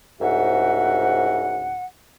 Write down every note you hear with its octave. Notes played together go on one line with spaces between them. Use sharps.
C2 G#2 C#3 F#4 E5 F#5